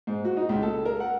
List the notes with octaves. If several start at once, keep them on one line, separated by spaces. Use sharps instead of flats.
G#2
F#4
D#4
C#2
A4
A#4
F#5